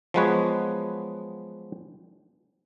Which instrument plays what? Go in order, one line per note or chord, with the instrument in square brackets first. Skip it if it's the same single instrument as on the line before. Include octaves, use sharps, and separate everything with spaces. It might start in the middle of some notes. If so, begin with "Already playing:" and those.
[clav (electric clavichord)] F3 F#3 G#3 B3 B4 C#5